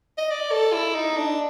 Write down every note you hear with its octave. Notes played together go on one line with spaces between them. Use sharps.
D#5
D5
A4
E4
D#4
D4